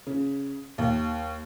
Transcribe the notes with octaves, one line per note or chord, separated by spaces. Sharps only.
C#3
D#2